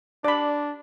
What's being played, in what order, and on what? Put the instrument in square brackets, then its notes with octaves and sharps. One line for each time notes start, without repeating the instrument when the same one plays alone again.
[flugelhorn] D4 [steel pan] D5 B5